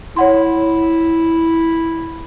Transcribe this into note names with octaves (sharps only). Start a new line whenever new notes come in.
E4 C#5 F#5 C6